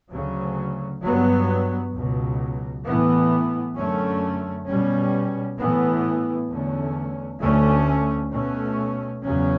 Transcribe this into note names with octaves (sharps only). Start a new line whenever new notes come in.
D2 C#3 F#3
G2 F#3 B3
C#2 B2 F#3
A2 E3 B3
F#2 D3 A3 C#4
B2 G3 C#4
A2 E3 B3
E2 D3 A3 C#4
D2 D3 A3 C#4
B2 A3 C#4
E2 C#3 F#3 C#4